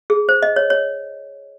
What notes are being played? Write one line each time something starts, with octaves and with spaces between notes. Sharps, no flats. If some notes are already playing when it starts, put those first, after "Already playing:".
G#4
C5
D#5
C#5
C#5